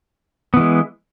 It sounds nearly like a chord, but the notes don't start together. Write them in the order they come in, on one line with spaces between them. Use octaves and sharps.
B3 E3 G#3